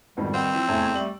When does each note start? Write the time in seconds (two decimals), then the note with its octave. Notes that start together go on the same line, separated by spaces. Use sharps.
0.17 F2 G#2 B2 D#3 G3 B3
0.34 C4 F5 F#5
0.54 E3 F3 E6
0.68 F1 E2 A3 G#5
0.95 G3 A3 F#7